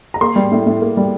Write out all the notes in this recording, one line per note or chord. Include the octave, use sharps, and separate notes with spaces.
A#5
A#3 C6
G3
A2
A2
A#3
G3